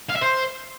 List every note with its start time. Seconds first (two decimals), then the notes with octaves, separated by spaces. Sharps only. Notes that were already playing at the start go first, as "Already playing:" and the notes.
0.10 F5
0.16 E5
0.22 C5